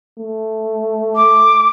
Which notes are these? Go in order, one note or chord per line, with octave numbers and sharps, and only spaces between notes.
A3
D6